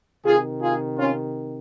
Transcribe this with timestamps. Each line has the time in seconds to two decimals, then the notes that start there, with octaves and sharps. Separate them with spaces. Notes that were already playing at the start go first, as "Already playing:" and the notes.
0.24 C3 D#3 F4 G#4
0.60 F4 G#4
0.97 C#4 F4